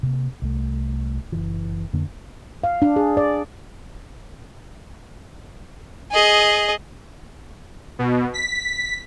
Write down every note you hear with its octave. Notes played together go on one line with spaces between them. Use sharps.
C3 A#3
C2 A3
F#1 E3
F2 D3 A#3
F5
D4
G#4
D5
G#4 D#5
B2
B6